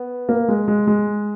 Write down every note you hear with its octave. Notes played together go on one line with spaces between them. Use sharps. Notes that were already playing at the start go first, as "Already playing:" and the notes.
Already playing: B3
A#3
G#3
G#3
G#3